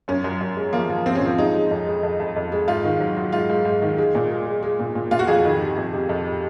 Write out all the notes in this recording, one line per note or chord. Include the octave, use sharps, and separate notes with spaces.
F#2 C#4
F#2
F#2
G#3
F3 A#3
F3
F3 C4
C#4
F3 C4
G#3 D#4
G#3
F2
G#3
F2
F2
F2
G#3
G#2 F4
D#3
F#3
F#3
G#2 F4
G#2
G#2
D#3
G#3
A#2
G#3
G#3
G#3
A#2
A#2
A#2 F4
F#4
F2 G#4
D#3
C3
F2
C3
F2